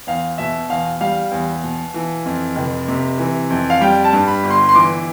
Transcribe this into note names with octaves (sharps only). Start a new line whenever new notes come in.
E2 F5
B2 E5
E2 F5
G3 F5
E2
B2
E3
F2
F1
C3
E3
F2
F5
G3 G5
A5
G2
B5
G1
C6
C6
E3 D6